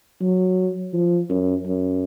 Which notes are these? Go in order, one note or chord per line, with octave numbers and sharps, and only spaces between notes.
F#3
F3
F#2
F#2